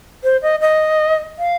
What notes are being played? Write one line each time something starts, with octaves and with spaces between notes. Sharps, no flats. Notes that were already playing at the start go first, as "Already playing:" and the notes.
C5
D#5
D#5
F5